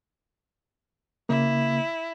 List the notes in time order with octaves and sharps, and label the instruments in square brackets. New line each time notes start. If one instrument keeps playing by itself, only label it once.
[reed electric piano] C#3 A#3 [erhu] E4